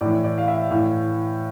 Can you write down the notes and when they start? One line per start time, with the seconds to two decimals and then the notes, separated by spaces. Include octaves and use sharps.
0.01 A2 E3 D5
0.24 D5
0.38 F5
0.48 E5
0.71 A2 E3 F5